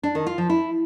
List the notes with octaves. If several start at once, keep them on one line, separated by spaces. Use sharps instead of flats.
D4
D#3
F4
F3
E4